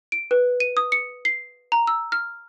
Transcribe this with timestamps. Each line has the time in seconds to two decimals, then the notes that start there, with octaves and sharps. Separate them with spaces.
0.12 D7
0.31 B4
0.60 D#7
0.77 D#6
0.92 C#7
1.25 C7
1.72 A#5
1.87 E6
2.12 F6